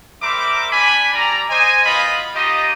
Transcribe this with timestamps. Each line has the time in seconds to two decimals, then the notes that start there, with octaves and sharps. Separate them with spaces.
0.22 G3 A#4 C5 E5 B5 D6
0.72 D4 G#5 B5
1.14 G3 G4 D5 A#5
1.49 C5 D#5 G#5
1.85 B3 F4 F#4 D#5 F5 B5
2.36 D#4 F4 G4 D#5